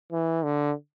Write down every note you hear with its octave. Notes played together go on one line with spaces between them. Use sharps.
E3
D3